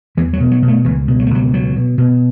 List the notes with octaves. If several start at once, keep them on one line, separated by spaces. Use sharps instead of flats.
E2 E3
F#3
B2
F#3
B2
A3
C#2 E3
B2
F#3
A3
C#2 F#3
B2 F#3
B2
B2